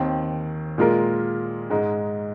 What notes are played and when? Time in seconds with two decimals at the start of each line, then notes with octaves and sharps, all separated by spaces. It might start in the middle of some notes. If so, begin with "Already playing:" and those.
Already playing: D#2 D#3 C4
0.78 A#2 G#3 F4 A#4
1.70 G#2 G#3 D#4